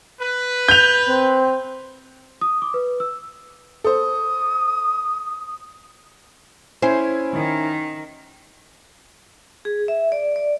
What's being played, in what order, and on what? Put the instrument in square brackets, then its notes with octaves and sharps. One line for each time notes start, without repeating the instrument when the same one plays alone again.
[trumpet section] B4
[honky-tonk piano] G6 F7
[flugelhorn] C4
[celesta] D#6
D6
B4
E6
[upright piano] A4 C5 [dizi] D#6
[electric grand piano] C#4 E4 G#5 [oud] C5
[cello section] D#3
[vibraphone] G#4
E5
D5
D5